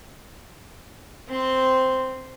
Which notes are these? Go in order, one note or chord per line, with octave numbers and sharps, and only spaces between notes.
C4 C6